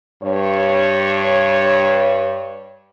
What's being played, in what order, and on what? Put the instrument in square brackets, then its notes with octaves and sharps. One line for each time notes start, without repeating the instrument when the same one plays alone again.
[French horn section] G2 C#5